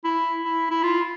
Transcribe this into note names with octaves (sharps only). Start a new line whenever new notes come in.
E4
E4
E4
F4